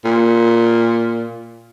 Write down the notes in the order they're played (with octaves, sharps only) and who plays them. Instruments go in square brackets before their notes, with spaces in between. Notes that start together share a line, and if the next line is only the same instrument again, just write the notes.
[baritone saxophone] A#2